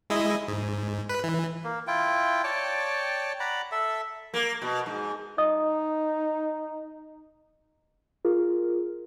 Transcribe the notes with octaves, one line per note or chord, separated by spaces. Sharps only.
G#3 E4 D#5
G#2
B4
E3
A#3
E4 F4 G5
C#5 D5 G5 A5
D5 F#5 A#5 B5
A4 E5
A#3
B2
G#2
D#4 D#5 D#6
F4 G#4 A#4